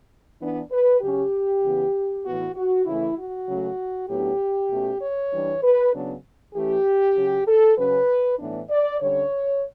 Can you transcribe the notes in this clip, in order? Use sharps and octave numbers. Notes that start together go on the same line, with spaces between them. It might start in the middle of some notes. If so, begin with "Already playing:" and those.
E3 B3 D4
B4
C#3 F#3 C#4 G4
C#3 E3 B3
A2 E3 B3 F#4
F#4
C#3 E3 A3 E4
F#4
C#3 F#3 A3 C#4
A2 F#3 B3 D4 G4
B2 A3 C#4
C#5
E3 G3 D4
B4
C#3 F#3 B3 D4
E3 A3 C#4 G4
C#3 F#3 C#4
A4
C#3 F#3 C#4 B4
A2 E3 B3 D4
D5
D3 G3 C#4 C#5